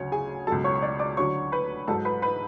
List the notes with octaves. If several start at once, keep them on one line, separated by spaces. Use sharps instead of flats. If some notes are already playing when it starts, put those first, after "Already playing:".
Already playing: D2 C#3 F#3 C#4 C#5
G#4 G#5
C#2 B2 F#3 A4 A5
C#5 C#6
C#6
D5 D6
D5 D6
D2 D3 F#3 C#5 C#6
B4 B5
G#2 F#3 A4 A5
B4 B5
B4 B5